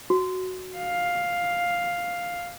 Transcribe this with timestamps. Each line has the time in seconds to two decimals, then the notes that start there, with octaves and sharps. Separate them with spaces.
0.10 F#4
0.77 F5